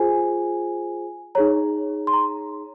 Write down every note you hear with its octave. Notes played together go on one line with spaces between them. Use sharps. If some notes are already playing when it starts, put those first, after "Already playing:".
Already playing: F4 G#4 C5 G#5
D#4 G#4 C#5 A#5
C6
A#5